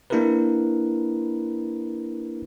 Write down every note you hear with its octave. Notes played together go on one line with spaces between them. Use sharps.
A#3 D4 E4 G4 A#4 B4